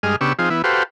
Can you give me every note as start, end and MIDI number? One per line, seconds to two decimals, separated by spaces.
0.03 0.16 43
0.03 0.16 56
0.03 0.16 68
0.03 0.16 75
0.03 0.16 89
0.21 0.33 49
0.21 0.33 59
0.21 0.33 62
0.21 0.33 67
0.21 0.33 85
0.21 0.33 88
0.39 0.49 53
0.39 0.49 60
0.39 0.49 63
0.39 0.49 65
0.39 0.49 68
0.50 0.62 52
0.50 0.62 59
0.50 0.62 64
0.64 0.83 66
0.64 0.83 67
0.64 0.83 69
0.64 0.83 71
0.64 0.83 72
0.64 0.83 77